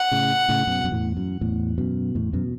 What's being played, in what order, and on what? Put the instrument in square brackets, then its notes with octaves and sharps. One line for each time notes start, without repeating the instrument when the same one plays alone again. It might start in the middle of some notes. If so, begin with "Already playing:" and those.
Already playing: [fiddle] F#5
[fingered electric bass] A2 C#3
A2 C#3
F#2 B2
F#2
E2 A2
F#2
E2 A2
F#2 B2
E2 A2
F#2 B2